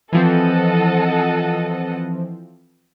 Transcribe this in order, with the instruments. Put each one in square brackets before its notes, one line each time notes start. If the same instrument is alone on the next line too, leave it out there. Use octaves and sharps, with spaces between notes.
[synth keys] E3 F3 C4 [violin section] A4 D#5 F#5